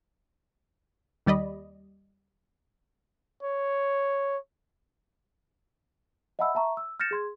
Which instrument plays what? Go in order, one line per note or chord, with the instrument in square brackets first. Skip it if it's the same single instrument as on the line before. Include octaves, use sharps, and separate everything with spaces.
[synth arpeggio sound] D#2 G3 D5 D#5 B5
[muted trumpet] C#5
[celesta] D#5 E5 F#5 A5 B5 E6
E5 A5 A#5 C#6
E6
F6 G6 A6 A#6 C#7 E7
G#4 C6 G#6